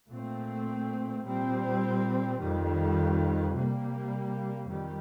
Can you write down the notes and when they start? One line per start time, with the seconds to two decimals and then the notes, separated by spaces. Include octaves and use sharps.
0.10 A#2 A3 C4
1.25 A#2 G3 C4
2.40 F2 D#3 G3
3.54 C3 G3 A#3
4.70 F2 D#3 G3